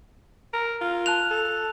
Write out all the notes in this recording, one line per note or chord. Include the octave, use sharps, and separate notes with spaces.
A#4
F4
A5 F#6 F7
A4